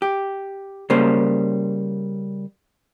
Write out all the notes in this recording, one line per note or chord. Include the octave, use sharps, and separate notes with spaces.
G4
C#3 G3 A#3 C5